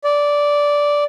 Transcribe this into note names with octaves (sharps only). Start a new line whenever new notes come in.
D5